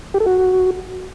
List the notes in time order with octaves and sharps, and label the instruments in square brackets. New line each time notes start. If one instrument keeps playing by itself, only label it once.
[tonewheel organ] G4
A4
F#4